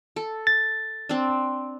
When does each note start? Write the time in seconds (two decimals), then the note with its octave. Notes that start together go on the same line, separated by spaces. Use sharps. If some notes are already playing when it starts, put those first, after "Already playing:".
0.16 A4
0.47 A6
1.09 C4 D4